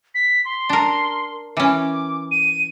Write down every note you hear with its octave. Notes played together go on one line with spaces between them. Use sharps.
B6
C6
D4 A#4
E3 C#4 D6
D#7